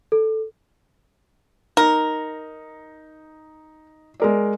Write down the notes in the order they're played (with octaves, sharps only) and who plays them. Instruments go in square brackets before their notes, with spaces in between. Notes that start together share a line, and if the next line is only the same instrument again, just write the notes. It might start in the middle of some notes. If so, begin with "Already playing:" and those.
[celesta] A4
[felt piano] D#4 [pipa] A#4
[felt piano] G#3 A#4 D5